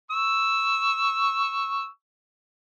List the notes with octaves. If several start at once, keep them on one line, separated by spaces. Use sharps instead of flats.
C#6 E6